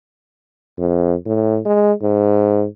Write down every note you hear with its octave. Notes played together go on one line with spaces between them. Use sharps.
F2
A2
G#3
G#2